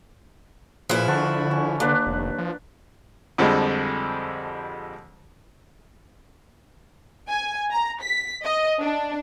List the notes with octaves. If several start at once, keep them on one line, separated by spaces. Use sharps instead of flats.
A#2 F3 E4 G#4 B4
D3 F#5 A5 C#6
C#4
D#2 A#3 D4 B4
F1
F3
F2 D3 F3 G3 G#3
G#5
A#5
B6
D#5
D4